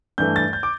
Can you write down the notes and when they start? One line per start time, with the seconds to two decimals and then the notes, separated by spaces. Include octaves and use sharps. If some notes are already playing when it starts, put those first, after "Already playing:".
0.18 G2 E3 A3 G6
0.36 A6
0.53 G6
0.63 D6